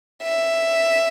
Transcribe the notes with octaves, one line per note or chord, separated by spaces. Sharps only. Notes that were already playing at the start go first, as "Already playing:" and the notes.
E5